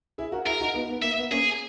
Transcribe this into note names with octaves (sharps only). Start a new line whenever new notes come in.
E4 G#4
F#4 A#4
E4 G#4 A#4
D#4 F#4
B3 D#4
B3
A#3 E5
B3
A#3 C#4 G#4